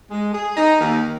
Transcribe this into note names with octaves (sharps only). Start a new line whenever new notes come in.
G#3
G#4
D#4
D#2